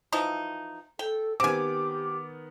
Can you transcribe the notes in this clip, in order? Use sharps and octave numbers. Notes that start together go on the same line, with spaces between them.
E3 F3 D#4
A4 G5
D#3 B3 C4 G4 G#5 D6 D7